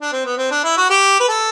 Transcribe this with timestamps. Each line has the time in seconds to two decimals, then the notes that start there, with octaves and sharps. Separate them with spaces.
0.02 D4
0.12 C4
0.25 B3
0.38 C4
0.51 D4
0.64 E4
0.77 F#4
0.90 G4
1.20 B4
1.29 A4